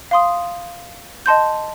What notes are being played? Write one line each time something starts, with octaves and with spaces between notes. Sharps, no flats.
F5 C6 D#6
D#5 A5 C6 G6